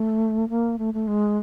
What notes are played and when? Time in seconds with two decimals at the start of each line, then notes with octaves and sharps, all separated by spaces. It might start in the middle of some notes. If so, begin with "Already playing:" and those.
Already playing: A3
0.49 A#3
0.78 A3
0.94 A3
1.07 G#3